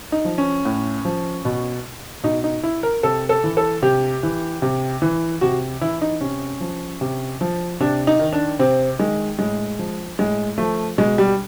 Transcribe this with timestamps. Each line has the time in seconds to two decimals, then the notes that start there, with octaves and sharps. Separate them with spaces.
0.12 D#4
0.25 F3
0.38 C#4
0.65 A2
1.05 F3
1.45 B2
2.23 B2 D#4
2.44 D#4
2.63 E4
2.83 A#4
3.03 C3 A4
3.29 A4
3.44 E3
3.57 A4
3.82 C3 G4
4.23 E3
4.62 C3
5.02 E3
5.41 C3 F#4
5.81 E3 E4
6.02 D#4
6.21 C3 C#4
6.60 F3
7.01 C3
7.41 F3
7.80 C3 D4
8.07 D#4
8.19 D#3
8.33 D4
8.59 C3 C4
8.99 D#3 G#3
9.39 A2 G#3
9.79 F3
10.19 A2 G#3
10.58 F3 A3
10.98 B2 G#3
11.18 G3